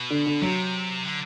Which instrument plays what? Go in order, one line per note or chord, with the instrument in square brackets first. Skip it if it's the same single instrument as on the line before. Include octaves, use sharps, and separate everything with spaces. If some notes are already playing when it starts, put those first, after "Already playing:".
Already playing: [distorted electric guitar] B2
[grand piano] D3
D3
[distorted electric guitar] C3 [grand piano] F#3
[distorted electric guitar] D3